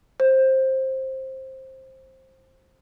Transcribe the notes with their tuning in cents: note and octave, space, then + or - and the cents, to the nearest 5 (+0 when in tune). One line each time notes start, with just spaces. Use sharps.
C5 +15